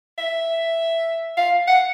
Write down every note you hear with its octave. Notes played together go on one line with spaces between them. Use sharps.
E5
F5
F#5